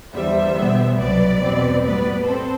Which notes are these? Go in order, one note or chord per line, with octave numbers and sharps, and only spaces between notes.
E2 D3 G3 C5 E5
B2 G3 B3
C2 B2 F#3 B4 D5
E2 B2 G3 C4
A2 G3 B3 B4 D5
C4 A4 C5